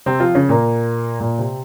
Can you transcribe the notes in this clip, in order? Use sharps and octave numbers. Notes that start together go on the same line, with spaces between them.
C3 C4
F3 F4
C#3 C#4
A#2 A#3
A#2 A#3
C3 C4